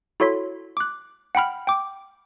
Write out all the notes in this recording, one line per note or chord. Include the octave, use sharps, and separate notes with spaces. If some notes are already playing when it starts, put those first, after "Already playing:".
E4 F#4 A4 C#5 C6 B6
D6 F#6
F#5 G5 B5 F6
G5 D6